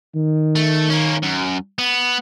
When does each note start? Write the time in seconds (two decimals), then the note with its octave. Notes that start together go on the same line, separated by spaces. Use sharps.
0.15 D#3
0.56 A3
0.90 A#3 C#4
1.23 F#2
1.78 B3